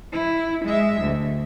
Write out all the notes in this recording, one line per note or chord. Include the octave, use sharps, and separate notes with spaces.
E4
G#3 E5
D2